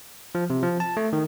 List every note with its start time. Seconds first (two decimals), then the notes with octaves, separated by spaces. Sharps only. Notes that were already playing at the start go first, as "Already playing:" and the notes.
0.35 F3
0.50 C3
0.63 F3
0.80 A5
0.97 A3
1.13 D#3